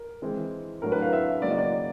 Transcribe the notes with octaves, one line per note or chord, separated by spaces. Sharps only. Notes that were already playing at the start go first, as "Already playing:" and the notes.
Already playing: A#4
E3 G#3 C4
A2 F#3 A3 D4 A#4
B4
F5
E5
C#3 F#3 A#3 D5
D#5
D5